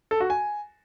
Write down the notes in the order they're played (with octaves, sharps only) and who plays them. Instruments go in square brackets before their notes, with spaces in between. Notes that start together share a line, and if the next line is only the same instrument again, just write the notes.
[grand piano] A4
F#4
G#5